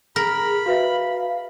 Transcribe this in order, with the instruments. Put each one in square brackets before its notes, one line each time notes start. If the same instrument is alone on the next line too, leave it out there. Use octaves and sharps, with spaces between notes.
[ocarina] G#4 [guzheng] A#4 [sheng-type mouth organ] B5
[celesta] F#4 B4 E5 [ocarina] F5